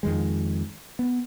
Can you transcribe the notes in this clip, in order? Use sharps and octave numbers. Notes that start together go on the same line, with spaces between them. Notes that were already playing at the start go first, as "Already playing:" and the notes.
F2 D#3 G#3
B3